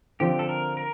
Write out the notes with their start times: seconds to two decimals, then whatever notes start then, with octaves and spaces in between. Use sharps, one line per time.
0.20 D3 F3 C4 F4 G4
0.39 A4
0.49 A#4
0.77 A#4